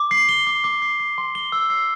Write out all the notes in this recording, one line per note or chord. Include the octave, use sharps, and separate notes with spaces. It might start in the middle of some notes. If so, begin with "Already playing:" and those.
Already playing: D6
C7
G7
D6
D6
C7
C7
C6
G7
E6
C7